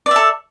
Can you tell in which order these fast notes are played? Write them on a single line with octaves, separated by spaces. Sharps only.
D5 E5 A4